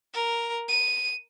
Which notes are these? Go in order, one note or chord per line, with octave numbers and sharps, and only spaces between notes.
A#4
D#7